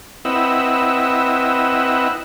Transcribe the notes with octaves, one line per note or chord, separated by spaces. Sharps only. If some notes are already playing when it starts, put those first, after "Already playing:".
C4 E4 B4 D#5 F#5 E6